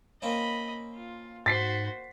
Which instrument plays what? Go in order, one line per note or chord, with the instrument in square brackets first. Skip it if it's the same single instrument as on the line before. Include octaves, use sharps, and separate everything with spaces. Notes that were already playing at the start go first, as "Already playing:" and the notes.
[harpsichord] A#3 C4 C#4 [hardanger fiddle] D#5 B5
[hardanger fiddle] F4
[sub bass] G#2 [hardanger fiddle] F#4 C5 [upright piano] A6 B6 C7